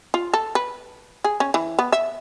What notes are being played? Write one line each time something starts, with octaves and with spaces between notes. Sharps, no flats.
F4
A4
B4
G#4
C#4
E3
B3
E5